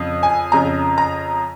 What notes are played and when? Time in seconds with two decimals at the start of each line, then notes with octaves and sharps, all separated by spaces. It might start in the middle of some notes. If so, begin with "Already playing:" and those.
Already playing: F2 C#3
0.23 G#5
0.52 F2 C#3 A#5
0.98 A#5